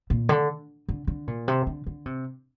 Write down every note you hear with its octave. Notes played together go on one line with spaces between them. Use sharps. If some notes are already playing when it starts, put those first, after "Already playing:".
A#2
D3
D3
D3
A#2
C3
D3
D3
C3